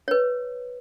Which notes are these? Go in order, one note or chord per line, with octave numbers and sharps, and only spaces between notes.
B4 C#5